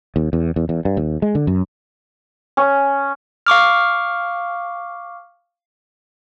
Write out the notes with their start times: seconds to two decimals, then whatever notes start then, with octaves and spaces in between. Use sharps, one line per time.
0.16 D#2
0.33 E2
0.56 E2
0.69 E2
0.85 G2
0.97 D#2
1.22 G#3
1.35 D3
1.47 F#2
2.57 C#4
3.47 F5 C#6 D6 F6